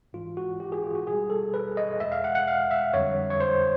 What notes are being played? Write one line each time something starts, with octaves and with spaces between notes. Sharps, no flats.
G#2 E3 G#3 F4
F#4
G4
G#4
F4
F#4
B2 G3 G#4
A4
B4
D#5
E2 B2 G#3 E5
F5
F#5
F#5
F5
E5
F2 D3 G3 C#5
C#5
C5